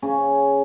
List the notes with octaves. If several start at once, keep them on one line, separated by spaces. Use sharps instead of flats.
C#3 C#4